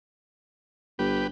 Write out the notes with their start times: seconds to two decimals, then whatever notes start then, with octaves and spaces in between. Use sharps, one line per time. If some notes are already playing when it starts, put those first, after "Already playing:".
0.99 G1 G4 B4